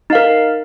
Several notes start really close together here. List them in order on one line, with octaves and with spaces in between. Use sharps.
D#4 F5 A#4